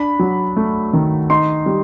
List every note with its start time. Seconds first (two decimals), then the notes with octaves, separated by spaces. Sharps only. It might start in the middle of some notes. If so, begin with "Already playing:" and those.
Already playing: D4 B5
0.19 F#3
0.56 A3
0.93 D#3
1.30 D#4 C6
1.66 G3